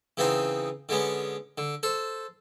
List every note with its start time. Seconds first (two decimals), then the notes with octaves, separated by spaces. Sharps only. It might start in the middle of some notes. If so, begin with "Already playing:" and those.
0.17 C#3 E3 B3 C4 D#4 C5
0.89 D3 G#3 B3 C#4
1.58 D3
1.83 A4 C5